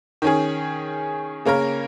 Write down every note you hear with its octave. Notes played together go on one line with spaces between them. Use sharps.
D#3 C#4 G#4
C#3 A#3 C#4 A#4